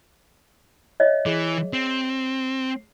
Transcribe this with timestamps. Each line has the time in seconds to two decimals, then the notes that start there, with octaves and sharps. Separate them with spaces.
1.00 C#5 D#5 E5
1.26 E3 G#4
1.73 C4